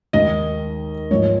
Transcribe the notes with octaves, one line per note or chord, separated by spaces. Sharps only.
D#2 D#3 G#3 D#5
G#2 F3 G#3 C#5